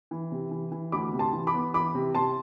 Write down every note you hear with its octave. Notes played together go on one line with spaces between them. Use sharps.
E3
C3
E3
E3
D2 B5 D6
C3
A5 C6
E3
B5 D6
B3
E3 B5 D6
C3
C3 A5 C6